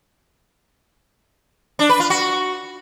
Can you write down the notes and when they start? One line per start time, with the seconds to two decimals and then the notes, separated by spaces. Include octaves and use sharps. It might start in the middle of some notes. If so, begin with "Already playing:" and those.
1.79 D4
1.89 B4
2.00 F4
2.10 F#4